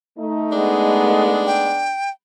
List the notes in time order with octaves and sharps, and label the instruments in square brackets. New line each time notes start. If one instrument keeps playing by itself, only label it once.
[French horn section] A3 D#4
[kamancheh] G#3 B3 [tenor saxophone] D4
[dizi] G5